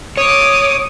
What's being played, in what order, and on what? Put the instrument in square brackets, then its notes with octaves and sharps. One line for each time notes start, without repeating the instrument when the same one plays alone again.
[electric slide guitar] C#5 [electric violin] D6 D#6